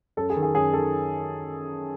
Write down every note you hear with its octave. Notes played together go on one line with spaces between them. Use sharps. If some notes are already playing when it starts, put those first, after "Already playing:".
F#2 A4
G#4
D#3
G#4
F#2 G#4
D#3 A4